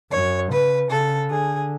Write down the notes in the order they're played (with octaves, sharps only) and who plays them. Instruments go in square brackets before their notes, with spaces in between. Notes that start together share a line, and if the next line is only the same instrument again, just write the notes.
[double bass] F#2 [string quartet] C#5
[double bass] C#3 [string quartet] B4
[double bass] C#3 [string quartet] A4
[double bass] D3 [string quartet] G#4